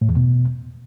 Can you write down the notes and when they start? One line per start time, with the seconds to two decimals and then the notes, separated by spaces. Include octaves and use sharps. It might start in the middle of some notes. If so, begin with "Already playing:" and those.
0.01 A2
0.09 E2
0.17 B2